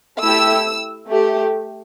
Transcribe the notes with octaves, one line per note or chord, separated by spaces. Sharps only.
A3 E4 G4 E6
A3 G4